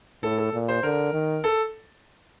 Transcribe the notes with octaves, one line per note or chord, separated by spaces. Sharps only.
A2 A4
A4
A#2
C5
D3 A#4
D#3
A4